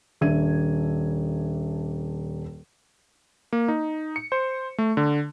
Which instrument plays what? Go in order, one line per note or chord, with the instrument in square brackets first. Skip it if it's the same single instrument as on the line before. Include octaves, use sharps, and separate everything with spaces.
[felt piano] D#1 D4 E5 G#6 D#7
[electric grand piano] A#3
D#4
C#7
C5
A3
D3